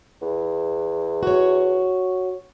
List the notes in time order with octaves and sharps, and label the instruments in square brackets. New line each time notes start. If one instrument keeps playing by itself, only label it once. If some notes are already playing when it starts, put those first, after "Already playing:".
[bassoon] E2
[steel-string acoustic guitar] F#4 C#5